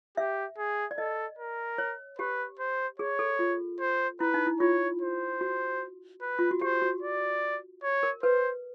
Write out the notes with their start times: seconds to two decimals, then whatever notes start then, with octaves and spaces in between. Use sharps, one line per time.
0.17 G4 E5
0.58 G#4
0.91 D5
0.98 A4 D#5
1.38 A#4
1.78 C#5
2.18 G4 B4
2.59 C5
2.99 G#4 C#5
3.19 A4
3.39 F4
3.80 C5
4.20 E4 B4
4.34 D#4
4.47 E4
4.60 F4 C#5
5.01 C5
5.41 F#4
6.22 B4
6.39 F4
6.51 F#4
6.61 G4 C5
6.82 F#4
7.02 D5
7.83 C#5
8.03 A#4
8.23 B4 C5